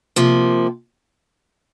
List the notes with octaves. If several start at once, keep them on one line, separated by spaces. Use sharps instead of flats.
C3 F3 A#3